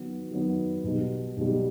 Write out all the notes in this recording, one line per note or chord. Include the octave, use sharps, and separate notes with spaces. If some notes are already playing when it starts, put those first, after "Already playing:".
Already playing: D#3 F#3 B3
D#3 F#3 B3
B1 B2 G3
B1 B2 G3